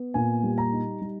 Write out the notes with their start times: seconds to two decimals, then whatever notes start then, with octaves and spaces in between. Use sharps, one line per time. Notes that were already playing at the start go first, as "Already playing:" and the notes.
Already playing: B3
0.14 A#2 G#5
0.43 G3
0.58 A#5
0.73 D#4
1.01 G3